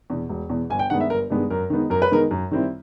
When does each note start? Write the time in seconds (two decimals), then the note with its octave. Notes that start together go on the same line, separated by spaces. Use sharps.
0.10 E2 B2
0.29 E1
0.50 E2 B2
0.70 G1 G#5
0.79 G5
0.90 G2 D#3 G#3 B3 F#5
1.00 E5
1.10 G1 A#4
1.30 G2 D#3 G#3 B3
1.50 F#2 A#4
1.70 D#3 G#3 B3 D#4
1.90 F#2 A#4
2.02 B4
2.11 D#3 G#3 B3 D#4 A#4
2.31 F#2
2.51 D#3 G3 C4 E4